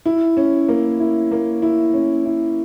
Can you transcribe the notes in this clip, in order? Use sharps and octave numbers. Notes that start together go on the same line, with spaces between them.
E4
C#4
A#3
E4
A#3
E4
C#4
E4